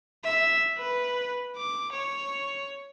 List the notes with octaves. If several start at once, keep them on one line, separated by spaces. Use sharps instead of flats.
E5
B4
D6
C#5